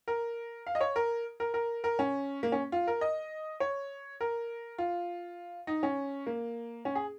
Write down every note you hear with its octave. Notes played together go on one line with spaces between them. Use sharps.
A#4
F5
D#5
C#5
A#4
A#4
A#4
A#4
C#4
A#3
C#4
F4
A#4
D#5
C#5
A#4
F4
D#4
C#4
A#3
C#4
G#4